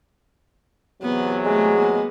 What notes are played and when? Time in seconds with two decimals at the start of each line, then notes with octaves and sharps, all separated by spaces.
1.02 E2 C3 F#3 B3
1.46 G#3 A3
1.75 A#3 B3